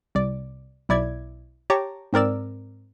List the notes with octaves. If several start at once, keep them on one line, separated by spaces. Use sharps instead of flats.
C2 D5
B1 E4 D5 G#6
G4 C#5 A5 A#5 D6
G#2 C4 A#4 D5 E6